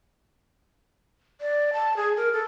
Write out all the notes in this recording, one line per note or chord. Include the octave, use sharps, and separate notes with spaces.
D5
A5
G#4
A#4
A4